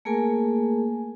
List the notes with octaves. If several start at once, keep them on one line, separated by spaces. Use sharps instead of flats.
A3 A#3 G#4 A#4 G#5